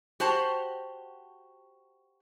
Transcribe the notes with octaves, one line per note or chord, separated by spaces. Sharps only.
F#4 G4 C5 A5